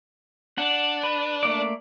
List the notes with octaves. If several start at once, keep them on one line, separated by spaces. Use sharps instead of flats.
D4 F#5
B4
A3 A#3 D5